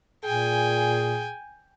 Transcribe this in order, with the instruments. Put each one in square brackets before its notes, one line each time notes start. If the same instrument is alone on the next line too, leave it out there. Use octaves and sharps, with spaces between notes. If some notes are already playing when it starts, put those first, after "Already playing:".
[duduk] A#2 [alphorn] G#4 [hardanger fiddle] G5 G#5